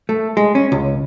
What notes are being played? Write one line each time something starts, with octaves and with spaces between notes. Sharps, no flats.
A3
G#3
C#4
C#2